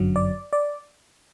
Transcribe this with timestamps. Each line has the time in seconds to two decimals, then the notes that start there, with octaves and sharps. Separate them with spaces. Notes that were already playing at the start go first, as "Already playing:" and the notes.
Already playing: G1 F#2 D3 F#3
0.16 D5
0.53 D5